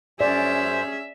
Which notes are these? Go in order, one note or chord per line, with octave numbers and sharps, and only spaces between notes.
F#2 C#4 G#4 C5 D5 E5